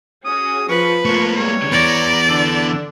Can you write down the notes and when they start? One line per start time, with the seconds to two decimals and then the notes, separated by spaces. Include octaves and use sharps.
0.25 C#4 F#4 G#4 D#6
0.69 F3 B4 C#6
1.05 F3 A3 A#3 F4 C#6
1.36 G3 G#3 E4 C#5
1.72 E3 B3 D5 A#5
2.29 D3 D4 A4